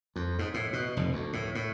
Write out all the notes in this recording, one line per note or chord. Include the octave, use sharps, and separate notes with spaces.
F2
G#2
A2
B2
F1
D2
A2
A2